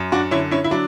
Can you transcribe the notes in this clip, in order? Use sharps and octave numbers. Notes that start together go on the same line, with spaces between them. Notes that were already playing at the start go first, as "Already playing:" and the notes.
Already playing: F#2
D4 F#4
D3 C#4 E4
C#4 E4
E4
F#3 D4